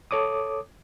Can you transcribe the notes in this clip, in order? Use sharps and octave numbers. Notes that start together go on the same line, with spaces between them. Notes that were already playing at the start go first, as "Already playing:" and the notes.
A4 C#5 D6 D#6